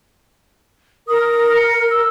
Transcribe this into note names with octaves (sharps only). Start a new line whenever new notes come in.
A#4 D#6
C#7
E6